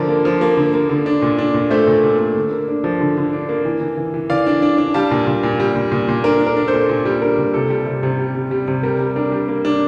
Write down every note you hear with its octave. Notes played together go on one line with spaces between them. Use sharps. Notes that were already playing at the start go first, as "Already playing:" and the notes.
Already playing: D3 F3 A#4 D5
A#3
F3
A#3
D3
A#3
D3
D4
A#2
D4
A#2
A3 C5 E5
A#2
A#2
A3
D3
A#3
D4
F3
D3
D3
D4
A#3
E3
E3
E3
E3
E3 D5 F5
D4
D4
D4
G3 F5 A5
A#2
A#2
A#2
G3
A#2
A#2
A#2
D4 A#4
D4
A#4
D4
A4 C5
A#2
A#2
G3
D4 A#4
A#2
C3 A4
G3
C3
C3
G3
G3
G3
C3
G3 A#4
G3
D4 A#4
G3
A#3
D4